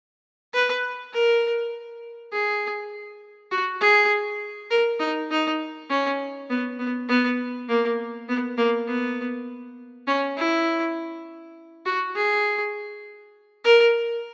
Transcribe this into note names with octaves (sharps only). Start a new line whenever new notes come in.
B4
A#4
G#4
F#4
G#4
A#4
D#4
D#4
C#4
B3
B3
B3
A#3
B3
A#3
B3
C#4
E4
F#4
G#4
A#4